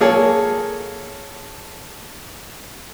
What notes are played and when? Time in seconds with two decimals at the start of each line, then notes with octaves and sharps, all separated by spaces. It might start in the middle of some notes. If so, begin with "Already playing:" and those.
0.01 A#3 G#4 A4 C#5